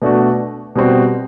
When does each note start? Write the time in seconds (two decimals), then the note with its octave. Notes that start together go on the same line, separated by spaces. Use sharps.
0.02 B2 A3 D4 F#4
0.76 B2 G3 C4 F#4